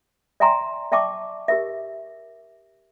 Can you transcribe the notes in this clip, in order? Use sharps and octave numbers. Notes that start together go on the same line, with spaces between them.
D5 E5 G5 G#5 A#5 C6
D5 E5 G5 A5 C#6 D6
G4 A#4 E5